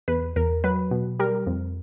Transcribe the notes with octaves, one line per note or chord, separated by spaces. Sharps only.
E2 B4
E2 A#4
F#3 B4
B2
G3 A#4
F2